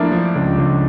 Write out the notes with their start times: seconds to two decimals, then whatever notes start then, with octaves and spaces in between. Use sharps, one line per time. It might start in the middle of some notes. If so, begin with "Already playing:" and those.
Already playing: F3 A3 A#3 D4 E4 A#4
0.12 F3
0.36 C#2
0.58 C#2